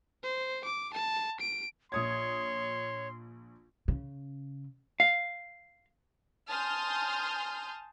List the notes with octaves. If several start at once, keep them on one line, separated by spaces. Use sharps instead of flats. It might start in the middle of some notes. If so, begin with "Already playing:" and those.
C5
D6
A5
D7
A#1 C#5 C6 D#6 G#6
C#3
F5
G#5 A5 C6 D#6 F6 G6